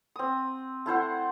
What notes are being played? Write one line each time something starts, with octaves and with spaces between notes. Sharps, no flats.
C4 D#6
A3 E4 C5 F#5